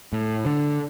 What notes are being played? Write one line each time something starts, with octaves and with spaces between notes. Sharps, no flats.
A2
D3